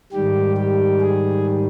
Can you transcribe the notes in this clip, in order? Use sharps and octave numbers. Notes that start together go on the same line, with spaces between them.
G#2 D#3 G3 G4
G4
G#4